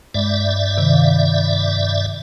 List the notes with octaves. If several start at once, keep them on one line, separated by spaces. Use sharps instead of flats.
G2 G#3 D5 E5
C3 D#3
F5